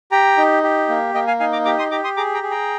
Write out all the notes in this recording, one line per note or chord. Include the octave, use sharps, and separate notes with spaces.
G4 G5 A#5
D#4
G4
A#3
A#3 D#5 G5
F5 G#5
D#4 F5 G#5
A#5 D6
G4 A#5 D6
C6 D#6
G4 A#5 D6
C6 D#6
G#4 A#5 D6
G5 A#5
G#4
G5 A#5